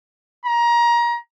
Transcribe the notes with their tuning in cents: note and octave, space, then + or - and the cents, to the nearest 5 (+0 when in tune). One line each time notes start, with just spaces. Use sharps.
A#5 +25